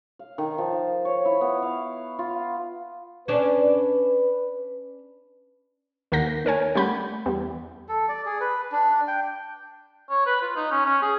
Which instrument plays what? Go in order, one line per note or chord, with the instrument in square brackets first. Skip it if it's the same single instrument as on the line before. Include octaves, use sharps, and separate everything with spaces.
[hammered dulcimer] F5
D#3
F3
C#5
E4
B3
F5
F4
[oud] C#4 D4 [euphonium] B4
[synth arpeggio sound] D#2 A#4 F#5 G6 A#6
D#2 A#4 C#5 G#5
G3 A3 C#4 F#5 B5 G6
E2 G3 B3
[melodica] A4
D5
G#4
B4
D4
G5
[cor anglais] C#5
B4
F4
D#4
C#4
C#4
G#4